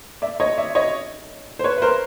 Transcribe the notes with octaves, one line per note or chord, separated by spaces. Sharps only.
D5 E5
C#5 D#5
D5 E5
C#5 D#5
C5
B4 C#5
B4
A#4 C5